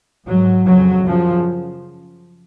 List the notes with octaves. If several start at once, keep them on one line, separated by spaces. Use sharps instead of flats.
G#2 F#3
F2 C#3 F#3
F#2 C#3 F3